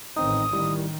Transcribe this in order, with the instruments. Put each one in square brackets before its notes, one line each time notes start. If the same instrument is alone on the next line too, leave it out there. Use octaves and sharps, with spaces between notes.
[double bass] A1 A2 [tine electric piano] D#3 C4 D#4 [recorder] D#6
[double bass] D#3 [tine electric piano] G3 E4